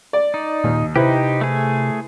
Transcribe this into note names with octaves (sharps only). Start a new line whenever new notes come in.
D5
D#4
D#2 A#2
C3 D#4 E4 G4 B4 C5
A3 G#4